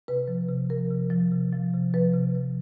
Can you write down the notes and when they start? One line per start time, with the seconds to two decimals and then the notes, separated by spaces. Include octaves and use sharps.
0.08 C3 B4
0.28 F3
0.49 C3
0.70 F3 A#4
0.91 C3
1.10 F3
1.32 C3
1.53 F3
1.74 C3
1.94 F3 B4
2.14 C3
2.35 F3